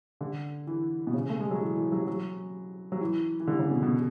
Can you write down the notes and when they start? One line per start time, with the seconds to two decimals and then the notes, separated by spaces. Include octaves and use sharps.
0.21 D3
0.67 E3
1.07 B2
1.14 C#3
1.30 A3
1.40 G#3
1.51 F#3
1.61 E3
1.77 E3
1.92 F#3
2.07 F#3
2.92 F#3
3.01 E3
3.40 E3
3.47 D3
3.59 C#3
3.71 B2
3.83 B2